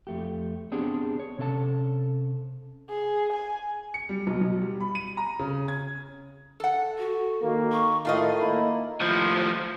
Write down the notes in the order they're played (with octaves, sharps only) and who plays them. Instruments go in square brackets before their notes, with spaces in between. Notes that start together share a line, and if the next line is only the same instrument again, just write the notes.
[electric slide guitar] F2 A3 G4
B3 C4 D4 G4 G#4 C5
C#5
C3 C#4 A4 C#5 A5
[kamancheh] G#4
G#5
[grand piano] C#7
G3
B1
B1
G3
B5
D#7
A#5
C#3
G#6
[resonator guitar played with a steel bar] A4 F#5
[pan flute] F#4
[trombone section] D#3 A#3
[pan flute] C#6
[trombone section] A2 D#3 [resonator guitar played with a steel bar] A3 F4 D#5 [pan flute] F5
[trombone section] A#3 D#4 E4 [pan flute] B5
[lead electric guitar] A2 F3